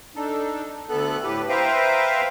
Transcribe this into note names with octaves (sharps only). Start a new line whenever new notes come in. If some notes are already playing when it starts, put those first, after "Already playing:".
D4 D#4 A4
D2 B3 A4 F#6
A2 G4 B4
B4 C5 E5 F5 G5 A#5